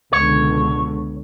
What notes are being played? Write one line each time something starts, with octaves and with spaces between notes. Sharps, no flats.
C#2 B2 D3 C#5